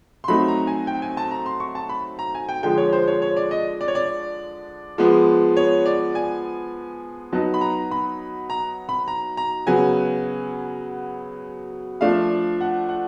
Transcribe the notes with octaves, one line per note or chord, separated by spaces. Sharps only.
C6
F#3 A3 C4 D#4 B5
A#5
G#5
G5
G#5
A5
A#5
C6
C#6
A5
B5
A#5
G#5
G5
D3 F3 G#3 G5
C#5
C5
C#5
C#5
D5
D#5
D5
C#5
D5
F3 G#3 B3
C#5
D5
G#5
F#3 B3 D#4 A5
B5
A#5
B5
A#5
B5
A#5
A#5
C#3 F#3 B3 G#5
F3 A3 D4 F5
F#5
F#5